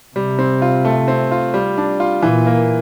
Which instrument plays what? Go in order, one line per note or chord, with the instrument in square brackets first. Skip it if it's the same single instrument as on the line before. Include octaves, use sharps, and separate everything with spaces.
[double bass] C3 [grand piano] G3
[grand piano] C4
F4
A3
C4
F4
G3
D4
F4
[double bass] A#2 [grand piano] E3
[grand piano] A#3